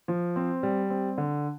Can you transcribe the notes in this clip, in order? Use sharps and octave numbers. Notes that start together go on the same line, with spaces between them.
F3
C4
G3
C4
D3